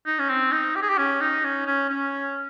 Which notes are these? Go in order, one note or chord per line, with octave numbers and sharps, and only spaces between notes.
D#4
C#4
C4
D#4
G4
G#4
G4
C#4
D#4
C#4
C#4
C#4